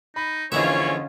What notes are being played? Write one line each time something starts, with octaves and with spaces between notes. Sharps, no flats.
D#4 B5
A#1 D3 E3 C#4 F4 C#5 D#5 E5